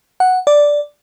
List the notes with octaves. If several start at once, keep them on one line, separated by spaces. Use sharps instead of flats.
F#5
D5